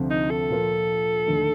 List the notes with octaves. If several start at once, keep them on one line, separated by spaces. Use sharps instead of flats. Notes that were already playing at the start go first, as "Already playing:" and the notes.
Already playing: D2 C3 F3 A3 C4
D#4
A4
A#2 F3 A#3
D#2 D3 A3